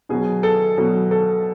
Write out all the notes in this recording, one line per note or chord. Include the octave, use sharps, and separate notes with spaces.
B2 F#3 G#4
A4
B2 F#3 A4
A4